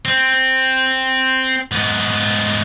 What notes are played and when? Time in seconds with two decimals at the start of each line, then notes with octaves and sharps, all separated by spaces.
0.05 C4
1.71 G#2 B3